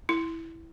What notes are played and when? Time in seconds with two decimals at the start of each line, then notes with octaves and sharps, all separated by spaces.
0.09 E4